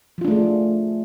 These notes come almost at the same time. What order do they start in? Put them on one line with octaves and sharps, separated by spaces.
F3 F4 D4 A3 G#4